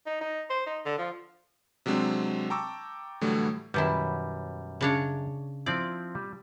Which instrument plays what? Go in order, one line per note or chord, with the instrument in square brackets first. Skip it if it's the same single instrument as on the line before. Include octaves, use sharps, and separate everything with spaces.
[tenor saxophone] D#4
D#4
C5
D#4
D3
F3
[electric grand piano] C3 F#3 G#3 C4 D4
G5 A5 A#5 C#6 D6 E6
A2 D3 E3 F#3 G3 A3
[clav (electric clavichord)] F#2 G3 [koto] B2 D#3 E4
[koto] C#3 D4 C#5
[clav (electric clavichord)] F3 C4 E4 [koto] D5
[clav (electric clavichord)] G3